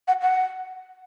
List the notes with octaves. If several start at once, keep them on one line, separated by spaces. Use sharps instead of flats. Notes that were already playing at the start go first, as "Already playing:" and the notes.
F#5
F#5